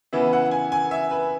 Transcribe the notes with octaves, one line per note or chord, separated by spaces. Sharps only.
C#3 E3 B3 E5
F#5
G#5
G#5
E5
B4